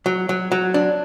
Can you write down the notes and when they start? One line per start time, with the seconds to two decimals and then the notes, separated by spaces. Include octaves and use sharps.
0.06 F#3
0.29 F#3
0.52 F#3
0.74 D4